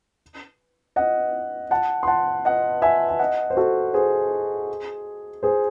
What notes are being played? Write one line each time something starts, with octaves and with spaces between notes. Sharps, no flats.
D#5 F#5
F#5 A5
C6
F#5 A5
D#5 F#5
E5 G#5
G#5
D#5 F#5
C5
F#4 A4
G#4 C5
G#4 C5